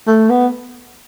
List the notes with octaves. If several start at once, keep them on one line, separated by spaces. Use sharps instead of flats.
A3
B3